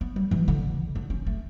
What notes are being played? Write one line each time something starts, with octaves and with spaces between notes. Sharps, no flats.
B3
G3
E3
D3
D4
C#4
A3